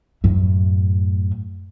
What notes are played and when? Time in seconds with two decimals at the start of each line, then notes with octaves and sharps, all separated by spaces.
0.24 F#2 A2